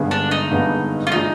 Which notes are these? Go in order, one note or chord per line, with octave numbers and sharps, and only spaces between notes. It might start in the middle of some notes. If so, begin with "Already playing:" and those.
Already playing: G#1 G2 D3 G#3 B3
D4
D#4
G#1 G2 D3 G#3 B3
F4
F3 G#3 D4 D#4